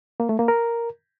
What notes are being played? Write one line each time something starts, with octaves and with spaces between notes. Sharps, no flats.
A#3
A3
A#3
A#4